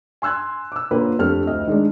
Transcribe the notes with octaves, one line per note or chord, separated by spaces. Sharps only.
G#5 C6 E6 F#6 G#6
D6 E6
D3 A#3 C#4 F4 B4
F2 A3 D4 G4 F6
D2 D#5
D#3 G#3 D4